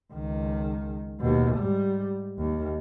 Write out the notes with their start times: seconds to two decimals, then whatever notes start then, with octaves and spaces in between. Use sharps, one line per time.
0.13 C#2 D#3
1.20 D#2 B2
1.56 G#2 G3
2.38 D#2